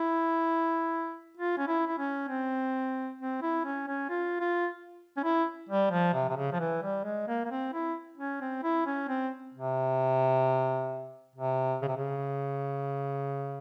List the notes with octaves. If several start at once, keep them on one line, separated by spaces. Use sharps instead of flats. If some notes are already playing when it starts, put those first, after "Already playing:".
Already playing: E4
F4
C#4
E4
E4
C#4
C4
C4
E4
C#4
C#4
F4
F4
C#4
E4
G3
F3
C3
C3
C#3
F3
E3
G3
G#3
A#3
A#3
C4
E4
C#4
C4
E4
C#4
C4
C3
C3
C#3
C3
C#3